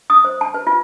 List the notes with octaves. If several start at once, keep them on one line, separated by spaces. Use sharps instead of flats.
D#6
C5
A5
B4
F4